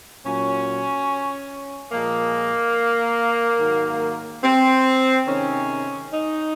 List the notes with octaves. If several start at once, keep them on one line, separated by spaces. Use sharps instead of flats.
A#2 F#3 C#4
A#2 F3 G#3 A#3
G#2 D#3 F#3
C4
C3 D#3 G#3 C#4
D#4